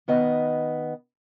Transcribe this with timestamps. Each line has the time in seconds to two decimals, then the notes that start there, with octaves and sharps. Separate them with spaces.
0.08 D#3 B3 D#5